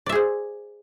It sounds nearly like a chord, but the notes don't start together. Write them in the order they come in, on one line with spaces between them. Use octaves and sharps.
D5 E5 G#4 C5